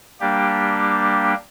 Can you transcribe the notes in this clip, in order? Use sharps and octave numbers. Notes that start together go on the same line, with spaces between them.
G3 A#3 D4 G4